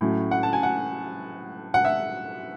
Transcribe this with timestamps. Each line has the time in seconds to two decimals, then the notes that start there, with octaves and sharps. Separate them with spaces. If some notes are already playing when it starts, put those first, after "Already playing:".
0.01 A2 F#3 A3 C#4
0.31 F#5
0.43 A5
0.53 G#5
0.63 F#5
1.74 F#5
1.85 E5